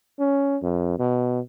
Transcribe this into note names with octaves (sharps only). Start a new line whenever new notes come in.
C#4
F2
B2